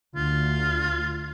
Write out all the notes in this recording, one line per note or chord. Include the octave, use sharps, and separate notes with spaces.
D2 F4